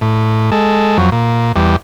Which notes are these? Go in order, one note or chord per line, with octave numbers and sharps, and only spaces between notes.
A2
G#3 A4
F2 F#3
A#2
E2 G3